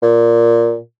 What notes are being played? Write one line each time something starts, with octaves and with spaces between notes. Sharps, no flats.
A#2